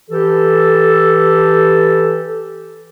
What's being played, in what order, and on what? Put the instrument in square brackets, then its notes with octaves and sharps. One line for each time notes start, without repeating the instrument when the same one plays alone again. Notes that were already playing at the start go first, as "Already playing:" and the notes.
[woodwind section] E3 G4 A4